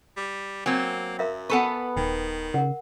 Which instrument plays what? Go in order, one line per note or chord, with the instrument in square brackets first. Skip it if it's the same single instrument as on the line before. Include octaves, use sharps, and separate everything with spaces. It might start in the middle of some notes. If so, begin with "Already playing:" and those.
[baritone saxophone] G3
[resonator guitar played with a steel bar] F#3 C4 [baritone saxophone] A#3 [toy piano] G#5
[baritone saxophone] F#2 [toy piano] A#4 E5 F5
[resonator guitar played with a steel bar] B3 A4 B4 [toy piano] F#5 G#5 C#6
[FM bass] D#1 [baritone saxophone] D#3 [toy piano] G5
[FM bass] C#3 [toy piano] A#4 F#5